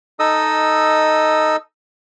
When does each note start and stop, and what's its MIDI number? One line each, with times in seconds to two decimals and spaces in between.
0.19 1.56 63
0.19 1.56 69
0.19 1.56 75
0.19 1.56 87
0.19 1.56 88